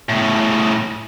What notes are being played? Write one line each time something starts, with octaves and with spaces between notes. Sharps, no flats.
A2 C#3